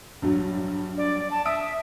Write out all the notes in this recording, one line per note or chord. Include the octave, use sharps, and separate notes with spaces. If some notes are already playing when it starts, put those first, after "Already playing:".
A#1 G2 F#3
D5
A5
E5 D#6 E6 D7